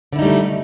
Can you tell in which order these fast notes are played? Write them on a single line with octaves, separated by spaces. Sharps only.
D3 E4 D#4 G3 A3